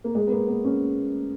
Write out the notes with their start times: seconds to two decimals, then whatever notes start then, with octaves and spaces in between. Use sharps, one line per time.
0.04 A#3
0.15 G#3
0.27 B3
0.32 A#3
0.48 B3
0.65 C#4